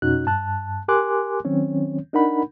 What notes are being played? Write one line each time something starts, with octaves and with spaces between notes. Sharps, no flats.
F2 B2 C#4 D#4 F#4 F#6
G2 A5 F#6
G4 A#4 G#5 C6 D6 F#6
D#3 F#3 C4 C#4 C#5
D4 D#4 A#4 F#5 B5